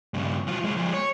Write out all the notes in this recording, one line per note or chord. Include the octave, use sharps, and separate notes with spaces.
G2 C#3
F#3 F4
G#3 F4
F3 G#3
C#5